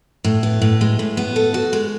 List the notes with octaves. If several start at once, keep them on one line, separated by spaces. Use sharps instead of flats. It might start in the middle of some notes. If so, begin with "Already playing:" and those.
A2
B3
A2
G#3
A2
B3
A4
F#4
G#3